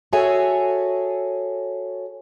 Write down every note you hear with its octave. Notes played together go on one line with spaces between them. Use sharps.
F#4 G#4 A4 C#5 E5 G#5